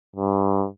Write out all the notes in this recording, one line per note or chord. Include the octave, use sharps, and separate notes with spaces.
G2